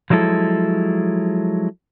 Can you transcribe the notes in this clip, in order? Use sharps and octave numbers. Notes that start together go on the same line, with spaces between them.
F3 F#3 G#3 E4 A4